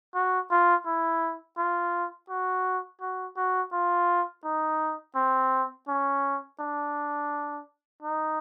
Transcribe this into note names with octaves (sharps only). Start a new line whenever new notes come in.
F#4
F4
E4
F4
F#4
F#4
F#4
F4
D#4
C4
C#4
D4
D#4